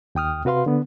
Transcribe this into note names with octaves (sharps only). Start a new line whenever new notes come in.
D#2 G5 D#6 F6
C3 F#4 B4 F5 C6
D3 B3